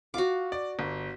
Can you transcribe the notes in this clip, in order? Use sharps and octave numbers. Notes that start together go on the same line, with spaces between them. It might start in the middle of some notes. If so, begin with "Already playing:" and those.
F4 F#4 F5 D6
D5
G1